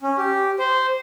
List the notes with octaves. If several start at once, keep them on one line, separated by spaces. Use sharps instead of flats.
C#4
G4
C5